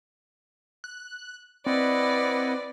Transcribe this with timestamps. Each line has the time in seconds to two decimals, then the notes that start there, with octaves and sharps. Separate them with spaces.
0.84 F#6
1.66 C4 E4 B4 D5 D#5 F#5